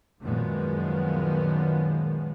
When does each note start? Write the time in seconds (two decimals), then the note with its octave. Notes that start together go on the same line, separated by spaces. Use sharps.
0.20 F#2 A#2 D#3 F3 G#3 B3